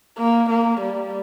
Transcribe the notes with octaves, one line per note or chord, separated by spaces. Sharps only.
A#3
A#3
G3